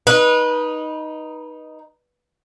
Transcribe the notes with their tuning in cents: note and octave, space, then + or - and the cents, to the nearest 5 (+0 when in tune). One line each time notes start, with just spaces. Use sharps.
D#4 +0 B4 -25